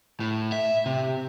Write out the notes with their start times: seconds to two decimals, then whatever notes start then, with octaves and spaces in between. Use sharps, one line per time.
0.20 A2
0.52 E5
0.86 C3